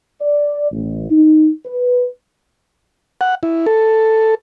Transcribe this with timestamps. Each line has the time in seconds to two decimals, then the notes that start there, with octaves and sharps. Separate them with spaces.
0.21 D5
0.71 A1
1.11 D#4
1.65 B4
3.21 F#5
3.43 E4
3.66 A4